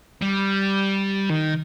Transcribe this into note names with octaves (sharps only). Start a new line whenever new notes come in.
G3
D#3